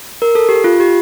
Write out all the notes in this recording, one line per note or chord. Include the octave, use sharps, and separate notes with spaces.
A#4
A4
G4
F4
G4